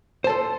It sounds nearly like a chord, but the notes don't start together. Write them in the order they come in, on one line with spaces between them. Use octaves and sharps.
C5 A5 A4